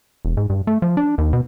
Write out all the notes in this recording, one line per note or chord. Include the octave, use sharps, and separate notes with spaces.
E1
G#2
G2
A3
F3
D4
D#2
B2